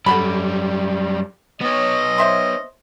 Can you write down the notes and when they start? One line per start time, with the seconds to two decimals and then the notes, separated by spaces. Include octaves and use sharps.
0.06 F#2 G3 A4 F#5 B5
1.61 B3 C#5 D#5
2.18 C5 E5 C6